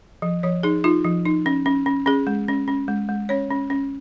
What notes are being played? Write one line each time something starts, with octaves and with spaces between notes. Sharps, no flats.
F3
F3 C#5
D#4 G#4
D#4 F4
F3
D#4
C#4
C#4
C#4
C#4 G#4
G#3
C#4
C#4
G#3
G#3
C#4 C#5
C#4
C#4